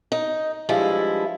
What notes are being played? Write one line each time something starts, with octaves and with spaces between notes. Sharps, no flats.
D#4
G2 F3 G#3 E4